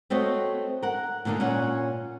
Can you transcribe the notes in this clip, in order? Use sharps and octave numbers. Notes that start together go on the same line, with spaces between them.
A3 C4 F#4 C#5 D#5
A#4 F#5
A#2 D3 A#3 D4 D#4
A#2 C#4 C#5 F#5